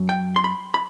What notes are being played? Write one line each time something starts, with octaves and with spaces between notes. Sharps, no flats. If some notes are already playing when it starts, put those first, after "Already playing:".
Already playing: F#2 F#3
G5
C6
B5
B5